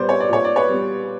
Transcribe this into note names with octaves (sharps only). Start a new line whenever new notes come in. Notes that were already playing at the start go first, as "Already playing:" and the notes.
Already playing: A#2 G3 B3 C5 D5
C#5
D5
A#2 C#5
D5
B4 C#5
G3 B3